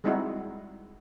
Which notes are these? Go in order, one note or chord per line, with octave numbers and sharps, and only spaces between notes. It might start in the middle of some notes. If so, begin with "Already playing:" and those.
G3 G#3 C4 D#4 E4 F#4